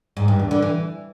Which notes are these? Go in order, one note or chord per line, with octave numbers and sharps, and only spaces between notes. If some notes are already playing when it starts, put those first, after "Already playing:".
G#2
G2
E2
D3
E3